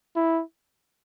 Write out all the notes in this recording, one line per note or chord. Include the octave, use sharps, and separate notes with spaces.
E4